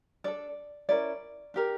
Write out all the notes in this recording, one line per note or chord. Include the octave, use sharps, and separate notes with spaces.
D4 A4 D5
C#4 E4 A#4 D5
D4 G4 A#4